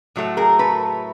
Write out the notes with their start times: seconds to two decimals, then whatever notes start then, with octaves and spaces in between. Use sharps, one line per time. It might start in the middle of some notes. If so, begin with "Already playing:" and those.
0.16 A2 F#3 A3
0.37 G#4 A#4
0.59 A4 B4